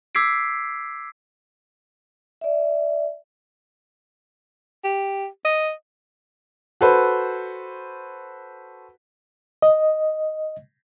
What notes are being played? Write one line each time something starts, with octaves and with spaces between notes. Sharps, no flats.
D6 E6 G#6 B6 C7 D7
D5 E5
G4
D#5
F#4 A4 B4 C5
D#5